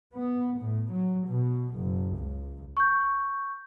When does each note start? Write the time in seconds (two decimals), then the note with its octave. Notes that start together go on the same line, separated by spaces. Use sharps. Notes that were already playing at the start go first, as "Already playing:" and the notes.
0.15 B3
0.59 A2
0.92 F#3
1.28 B2
1.76 F#1
2.17 C#2
2.77 C#6 G6